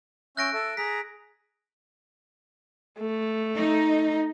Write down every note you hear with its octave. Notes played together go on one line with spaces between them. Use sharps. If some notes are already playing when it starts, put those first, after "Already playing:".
C#4 E5 F#6 G6 A#6 D7
A4 E5
G#4 A#5 B6
A3
D#4